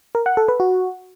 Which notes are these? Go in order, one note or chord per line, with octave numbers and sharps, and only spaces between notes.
A#4
F#5
A4
B4
F#4